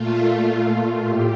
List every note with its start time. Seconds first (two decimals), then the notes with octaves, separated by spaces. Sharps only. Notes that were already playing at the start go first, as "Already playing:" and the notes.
Already playing: A#2 A3 F4
0.20 F4
1.05 A2 G4